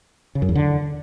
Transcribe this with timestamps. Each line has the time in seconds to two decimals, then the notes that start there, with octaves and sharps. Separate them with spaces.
0.35 C#3
0.42 F#2
0.49 E2
0.55 D3